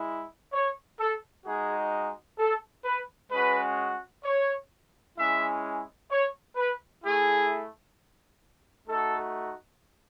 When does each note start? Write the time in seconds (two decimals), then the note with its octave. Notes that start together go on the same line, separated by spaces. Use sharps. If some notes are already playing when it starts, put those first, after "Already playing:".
Already playing: G#3 E4
0.53 C#5
1.00 A4
1.45 G#3 D#4 F#4 G#4
2.39 A4
2.85 B4
3.31 G#3 C#4 F#4 B4
4.25 C#5
5.17 G#3 C#4 E4 E5
6.10 C#5
6.56 B4
7.03 A3 E4 G#4
8.88 A3 D#4 F#4 A4